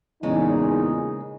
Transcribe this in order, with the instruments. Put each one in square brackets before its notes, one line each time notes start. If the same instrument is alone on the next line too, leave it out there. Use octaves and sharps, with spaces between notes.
[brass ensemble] E2 A#2 D#4 [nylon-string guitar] C#3 G#3